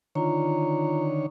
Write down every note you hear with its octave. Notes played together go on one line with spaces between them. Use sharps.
D3 D#3 F4 C#5 A#5